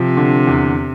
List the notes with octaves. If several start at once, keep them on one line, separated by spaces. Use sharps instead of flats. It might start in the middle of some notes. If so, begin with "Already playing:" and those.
Already playing: C3 F3
D3
E2